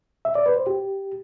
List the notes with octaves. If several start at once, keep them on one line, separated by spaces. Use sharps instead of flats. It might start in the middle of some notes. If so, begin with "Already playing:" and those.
E5
D5
B4
C5
G4